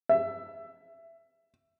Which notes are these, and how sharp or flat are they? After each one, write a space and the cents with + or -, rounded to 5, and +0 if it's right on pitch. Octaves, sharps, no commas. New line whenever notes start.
E5 +15